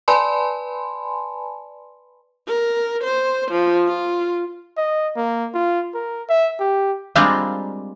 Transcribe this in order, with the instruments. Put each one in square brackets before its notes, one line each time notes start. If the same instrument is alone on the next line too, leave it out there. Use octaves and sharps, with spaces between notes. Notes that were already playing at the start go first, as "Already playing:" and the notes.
[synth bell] B4 D5 G#5 A5 B5 C6
[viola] A#4
C5
F3
F4
[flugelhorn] D#5
A#3
F4
A#4
E5
G4
[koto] G3 G#3 A#3 C4 D4 F4